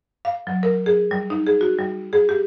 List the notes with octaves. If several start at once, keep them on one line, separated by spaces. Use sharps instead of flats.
F5
F#3
A#4
G#4
G3
D#4
G#4
F#4
G3
G#4
G4